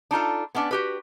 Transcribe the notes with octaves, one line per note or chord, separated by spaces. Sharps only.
D4 D#4 F4 A4
B3 C#4 D4 D5
F#4 G4 B4